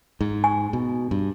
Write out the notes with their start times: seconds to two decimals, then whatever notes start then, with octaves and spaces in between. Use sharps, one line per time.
0.21 G#2
0.44 G#5
0.73 B2
1.11 G2